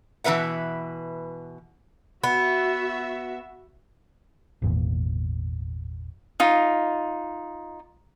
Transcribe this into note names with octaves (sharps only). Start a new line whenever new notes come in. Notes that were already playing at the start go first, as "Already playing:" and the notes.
B2 E3 D#4 B4 E5 F#5
B3 F#4 E5
G#1 E2 A#2
D#4 F4